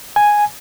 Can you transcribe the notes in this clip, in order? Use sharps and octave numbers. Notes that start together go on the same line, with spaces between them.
G#5